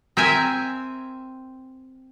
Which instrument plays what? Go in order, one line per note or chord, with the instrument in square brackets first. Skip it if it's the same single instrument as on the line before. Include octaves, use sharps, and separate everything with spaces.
[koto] C4 A#4 E5 G#5